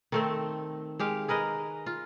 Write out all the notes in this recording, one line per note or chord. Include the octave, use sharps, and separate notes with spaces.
D#3 A3 C4
G#3 G4 F5
G#4 A#4 B4 D#5
F4